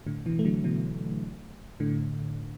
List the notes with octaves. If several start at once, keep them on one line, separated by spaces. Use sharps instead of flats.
A2 D3
B2 E3
A3
D3 F#3
B2 E3
A2 D3